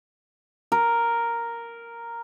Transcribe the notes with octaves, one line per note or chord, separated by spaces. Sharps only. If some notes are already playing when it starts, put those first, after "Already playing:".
A#4